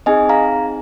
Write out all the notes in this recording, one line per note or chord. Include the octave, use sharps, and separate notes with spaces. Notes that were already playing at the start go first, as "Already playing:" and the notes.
C4 D#4 G#4 D#5 G#5
F5 A#5